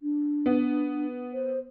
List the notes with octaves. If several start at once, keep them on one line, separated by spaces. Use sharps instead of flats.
D4
B3
C5